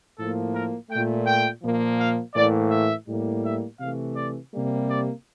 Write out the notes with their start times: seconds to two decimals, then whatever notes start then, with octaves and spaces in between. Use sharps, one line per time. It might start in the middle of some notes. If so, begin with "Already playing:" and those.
0.18 A2 F3 A#3 A4
0.54 A#4
0.91 A#2 A3 G5
1.26 G5
1.62 A#2 F3 A#3
2.00 F5
2.35 A2 E3 A#3 D5
2.71 E5
3.07 A2 G3 A#3
3.44 E5
3.79 C3 E3 A3 F5
4.16 D5
4.53 C3 G3 A#3
4.89 D5